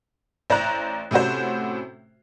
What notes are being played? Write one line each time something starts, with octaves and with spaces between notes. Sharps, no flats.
A1 C5 D5 A#5 F#6
A2 C3 C#4 F#4 C5